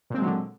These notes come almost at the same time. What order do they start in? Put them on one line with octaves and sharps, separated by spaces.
A#2 C4 G#3 F#3 D3